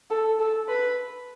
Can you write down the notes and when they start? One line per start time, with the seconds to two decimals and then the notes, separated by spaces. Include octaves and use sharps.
0.11 A4
0.39 A4
0.69 B4